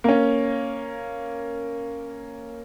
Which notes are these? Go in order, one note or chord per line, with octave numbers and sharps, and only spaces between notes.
A#3 C#4